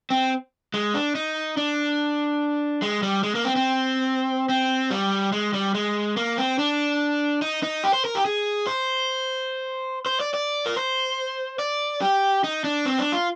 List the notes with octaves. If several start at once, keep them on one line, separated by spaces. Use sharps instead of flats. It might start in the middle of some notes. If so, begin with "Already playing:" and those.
C4
G#3
D4
D#4
D4
G#3
G3
G#3
A#3
C4
C4
C4
G3
G#3
G3
G#3
A#3
C4
D4
D#4
D#4
G4
C5
A#4
G4
G#4
C5
C5
D5
D5
A#4
C5
D5
G4
D#4
D4
C4
D4
F4